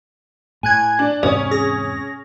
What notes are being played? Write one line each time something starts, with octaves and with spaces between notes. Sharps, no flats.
A2 G#5 F#6 G#6
D4
E2 G#2 C3 C#4 D#6
G#4 A#6